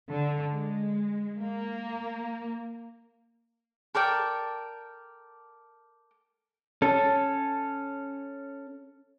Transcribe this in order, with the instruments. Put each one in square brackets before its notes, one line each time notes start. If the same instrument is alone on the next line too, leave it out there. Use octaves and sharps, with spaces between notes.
[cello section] D3
G#3
A#3
[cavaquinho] A4 A#4 D5 G5
[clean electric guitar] C#4 A4